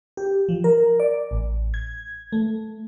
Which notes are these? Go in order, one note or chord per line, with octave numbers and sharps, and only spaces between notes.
G4
F3
A#4
D5
A1
G#6
A3